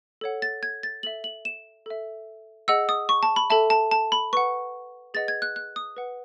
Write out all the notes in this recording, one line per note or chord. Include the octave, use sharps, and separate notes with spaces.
A4 C#5 F#5
A6
G#6
A6
A4 E5 F#7
F#7
E7
A4 E5
G#4 D#5 F#5 E6
D#6
C#6
A5
B5
A4 E5 A5
A5
A5
B5
B4 F#5 C#6
G#4 B4 D#5 F#5 A6
G#6
F#6
F#6
D#6
B4 F#5